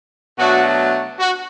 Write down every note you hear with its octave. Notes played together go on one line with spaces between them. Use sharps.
B2 F#3 A3 D4 F#4
F#4